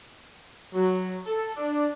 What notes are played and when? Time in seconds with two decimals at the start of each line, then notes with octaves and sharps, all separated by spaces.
0.74 F#3
1.26 A4
1.56 D4